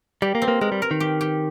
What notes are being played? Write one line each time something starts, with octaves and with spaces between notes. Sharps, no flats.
G3 G4
A#3
C4
A#3
G#3 A#4
G3
A#4
D#3
G4
G4